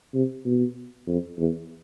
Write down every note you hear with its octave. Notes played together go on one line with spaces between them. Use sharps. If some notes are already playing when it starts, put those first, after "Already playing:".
C3
B2
F2
E2